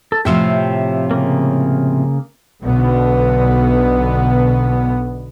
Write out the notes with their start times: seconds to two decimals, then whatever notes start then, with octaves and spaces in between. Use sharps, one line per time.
0.12 A4
0.25 A2 C3 F3 G4 E5 F5
1.11 C#3 A#3
2.63 B1 B2 D3 B3